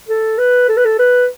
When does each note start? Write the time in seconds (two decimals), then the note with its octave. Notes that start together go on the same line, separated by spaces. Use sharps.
0.09 A4
0.38 B4
0.69 A4
0.77 B4
0.85 A4
0.99 B4